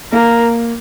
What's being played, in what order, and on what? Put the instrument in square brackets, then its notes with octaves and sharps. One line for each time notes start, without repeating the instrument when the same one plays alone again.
[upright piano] A#3 [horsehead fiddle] A#4